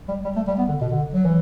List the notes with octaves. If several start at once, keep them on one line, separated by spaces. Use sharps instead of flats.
G3
G3
A3
G3
B3
D3
B2
D3
F#3
E3